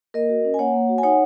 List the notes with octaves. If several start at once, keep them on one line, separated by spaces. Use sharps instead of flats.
A#3 A#4 D#5
F#4
C#4
G#5
A#3 C#5 F#5
A#3
F#4
G#5
D#4 C#5 F#5